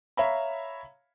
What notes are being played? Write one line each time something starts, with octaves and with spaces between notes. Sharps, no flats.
C#5 E5 F5 A#5 B5